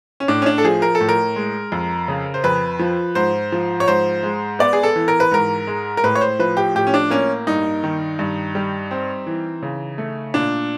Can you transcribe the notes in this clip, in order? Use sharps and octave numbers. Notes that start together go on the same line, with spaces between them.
C#4
A2 D4
C#4
D4
A4
F3 G#4
A#4
A4
A2
A#4
G#3
F2
C#3
C5
F2 B4
F3
G#2 C5
F3
C#5
G#2 C5
G#3
B3 D5
G#4
A4
E3
A#4
B4
G#2 A#4
G#3
A#4
A2 B4
C#5
C5
F3 B4
G4
A2 G4
C#4
D4
A#3 C#4
G2 D#4
D#3
G2
G3
C4
E3
C#3
A3
A#2 D4